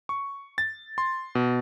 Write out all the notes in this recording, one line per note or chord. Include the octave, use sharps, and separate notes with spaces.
C#6
A6
C6
B2